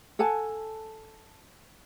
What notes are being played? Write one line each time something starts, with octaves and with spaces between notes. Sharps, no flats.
A4 F#5 G#5 A5